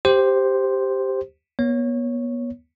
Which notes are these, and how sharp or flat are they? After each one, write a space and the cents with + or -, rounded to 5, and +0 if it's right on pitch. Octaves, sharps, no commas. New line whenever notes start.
G4 +0 C5 +0
B3 -35 C#5 +0